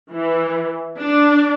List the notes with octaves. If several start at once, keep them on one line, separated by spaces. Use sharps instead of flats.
E3
D4